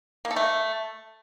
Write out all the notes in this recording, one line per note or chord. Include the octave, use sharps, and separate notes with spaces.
A#3
A4
A3